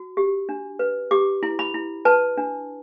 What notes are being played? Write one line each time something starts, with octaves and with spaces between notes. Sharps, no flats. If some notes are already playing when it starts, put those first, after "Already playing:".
Already playing: F#4
G4
D4
B4
G4 D6
E4
B5
E4
B4 A5
D4